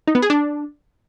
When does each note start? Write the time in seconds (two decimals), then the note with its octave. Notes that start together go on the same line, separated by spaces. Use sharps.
0.07 D#4
0.15 B3
0.22 G#4
0.30 D4